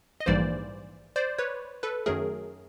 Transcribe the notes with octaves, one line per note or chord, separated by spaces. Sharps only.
D#5
A#1 G#2 E3 G3 A#3 C5 D5
C5 D5
B4 C#5
A4 B4
F#2 D#3 F#3 A3 G#4 A#4